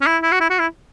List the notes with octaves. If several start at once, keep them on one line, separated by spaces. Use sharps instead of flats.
C#4
E4
E4
F#4
E4
F#4
E4